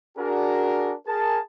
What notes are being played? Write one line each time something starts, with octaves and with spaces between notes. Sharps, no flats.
D4 F#4 G#4 A#4
G#4 A#4 A5